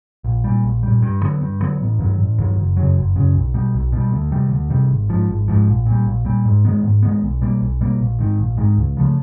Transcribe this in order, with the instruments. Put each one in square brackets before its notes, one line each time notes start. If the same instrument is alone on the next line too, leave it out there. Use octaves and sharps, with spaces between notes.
[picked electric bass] A#1
A#2 G3
A#1
A#2 G3
G2
D3 F#3 B3
G2
D3 F#3 B3
A1
G2 D#3 F#3
A1
G2 D#3 F#3
F#1
F#2 C#3 F#3
F#1
F#2 C#3 F#3
B1
B2 G3
B1
B2
G3
D2
C3 D#3 G3
D2
C3 D#3 G3
G#1
G#2 F3
G#1
G#2 F3
A#1
A#2
G3
A#1
A#2 G3
G#2
D#3 G#3 B3
G#2
D#3 G#3 B3
B1
B2 G3 A#3
B1
B2 G3 A#3
A#1
G#2 D#3
A#1
G#2 D#3
C#2
C#3 F3 A3